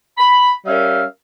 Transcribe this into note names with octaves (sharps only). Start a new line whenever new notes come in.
B5
G3 C#4 A#4 E5 F5